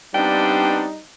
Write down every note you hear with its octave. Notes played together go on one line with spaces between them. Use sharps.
G3 B3 C4 D4 D#4 G5